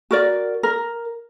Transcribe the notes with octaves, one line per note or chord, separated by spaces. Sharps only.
F#4 A#4 D5
A#4